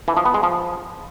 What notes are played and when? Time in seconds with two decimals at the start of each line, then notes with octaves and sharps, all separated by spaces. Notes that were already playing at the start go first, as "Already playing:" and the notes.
0.08 E3
0.17 F3
0.25 B3
0.34 G#3
0.43 F3